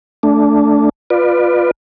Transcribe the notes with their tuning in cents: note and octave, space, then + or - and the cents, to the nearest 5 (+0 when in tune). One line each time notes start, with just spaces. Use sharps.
A3 +0 D4 -10
F4 +10 B4 +0 D5 +30